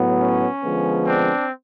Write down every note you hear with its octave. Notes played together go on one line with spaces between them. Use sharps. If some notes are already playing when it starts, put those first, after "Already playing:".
Already playing: A2 F#3 B3
C#4
D3 F3 G#3 B3
C4 D4